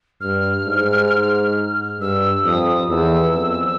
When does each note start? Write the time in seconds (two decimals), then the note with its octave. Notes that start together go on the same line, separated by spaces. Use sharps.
0.21 G2 F6
0.66 G#2
2.00 G2 E6
2.45 F2 D#6
2.89 E2 E6
3.35 F2